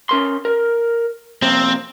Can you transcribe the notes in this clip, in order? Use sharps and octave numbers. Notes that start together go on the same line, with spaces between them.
C#4 A#4 C6
A#4
C3 F3 A#3 C4